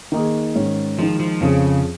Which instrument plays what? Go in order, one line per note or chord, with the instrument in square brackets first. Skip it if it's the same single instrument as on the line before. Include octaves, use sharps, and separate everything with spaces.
[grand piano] D#3 A#3 D#4 G#4
G#2 D#3 C#4
[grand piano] D#3 G#3 D#4 [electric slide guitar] F3
[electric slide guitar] F3
[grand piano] F2 F3 C#4 G#4 [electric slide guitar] C#3